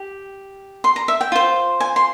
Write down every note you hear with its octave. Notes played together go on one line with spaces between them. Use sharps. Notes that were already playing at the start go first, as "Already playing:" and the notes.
Already playing: G4
C6
A#5
E5
G5
F4 C5
G#5
C6